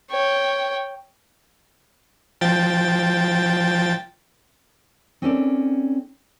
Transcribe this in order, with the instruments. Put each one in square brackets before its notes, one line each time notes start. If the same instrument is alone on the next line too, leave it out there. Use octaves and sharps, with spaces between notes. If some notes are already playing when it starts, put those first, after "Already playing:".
[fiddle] C#5 G5
[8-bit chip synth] F3 G5 A6
[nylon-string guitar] C4 C#4 D#4 A4 A#4 D5